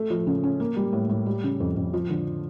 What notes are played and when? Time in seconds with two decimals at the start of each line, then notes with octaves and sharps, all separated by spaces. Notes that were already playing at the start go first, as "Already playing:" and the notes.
Already playing: A3
0.10 F3
0.27 C#3
0.44 C#4
0.60 A#3
0.76 G3
0.93 A2
1.09 A2
1.26 G3
1.44 C#3
1.60 F2
1.77 F2
1.94 F3
2.10 D3